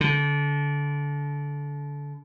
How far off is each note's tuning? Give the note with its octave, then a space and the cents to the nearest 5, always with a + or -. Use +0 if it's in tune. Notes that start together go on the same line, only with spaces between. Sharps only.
D3 -30